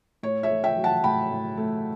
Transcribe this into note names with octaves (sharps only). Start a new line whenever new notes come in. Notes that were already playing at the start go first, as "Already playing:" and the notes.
A2 C#5
C#5 E5
A3
E5 G5
F#3
F#5 A5
A2 G5 B5
A2
A3